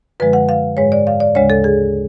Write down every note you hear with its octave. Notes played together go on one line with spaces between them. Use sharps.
F#2 D3 F3 G#3 B4
F#5
F5
G#2 G#3 C#5
D5
F5
D5
D2 C#3 G#3 C#5
A4
G#4